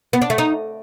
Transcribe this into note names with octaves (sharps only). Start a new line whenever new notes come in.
B3
D4
A3
D#4